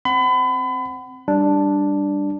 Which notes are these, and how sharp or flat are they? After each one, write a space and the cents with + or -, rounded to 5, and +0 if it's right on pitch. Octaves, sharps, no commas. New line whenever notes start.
C4 +0 F#5 +25 B5 +35
G3 +5 D4 +0